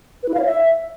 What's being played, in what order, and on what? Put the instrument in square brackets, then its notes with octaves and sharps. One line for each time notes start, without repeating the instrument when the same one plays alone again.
[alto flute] B4
E4
F5
C#5
E5